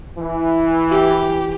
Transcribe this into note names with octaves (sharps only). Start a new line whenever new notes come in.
E3
G4